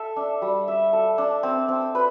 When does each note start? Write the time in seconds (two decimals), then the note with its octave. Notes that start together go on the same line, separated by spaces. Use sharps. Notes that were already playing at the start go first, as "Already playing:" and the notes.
Already playing: A4 E5
0.16 D4
0.42 G3
0.68 E5
0.93 A4
1.18 D4
1.43 C4
1.69 C4
1.95 B4